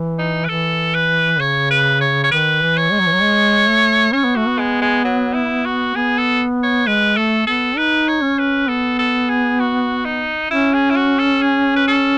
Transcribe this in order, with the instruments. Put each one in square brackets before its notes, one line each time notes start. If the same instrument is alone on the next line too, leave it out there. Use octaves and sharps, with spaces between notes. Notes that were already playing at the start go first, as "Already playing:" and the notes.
Already playing: [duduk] E3
[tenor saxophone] D#4
B4
[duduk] E3 [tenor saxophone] A4
[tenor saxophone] B4
[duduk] C#3 [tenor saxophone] C#5
[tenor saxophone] B4
C#5
C#5
[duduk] D#3 [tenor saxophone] B4
[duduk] E3
[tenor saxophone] C#5
[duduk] G#3
F#3
E3
F#3
G#3
A3
[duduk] C#4 [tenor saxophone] C#5
[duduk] B3
[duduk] A3 [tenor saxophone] F#4
[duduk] B3
[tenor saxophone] G#3
G#3
F#3
E4
F#4
[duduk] B3 [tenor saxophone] G#4
[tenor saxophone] A4
C#5
[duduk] G#3 [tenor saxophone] B4
[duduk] A3 [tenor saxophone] A4
[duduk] B3 [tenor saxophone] A4
[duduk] D#4 [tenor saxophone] B4
[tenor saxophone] C#5
[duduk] C#4
[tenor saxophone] B4
[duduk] B3 [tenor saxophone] A4
[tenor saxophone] A4
G#4
F#4
D#4
[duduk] C#4 [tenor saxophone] E4
[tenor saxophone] G#4
E4
F#4
A4
G#4
B4
A4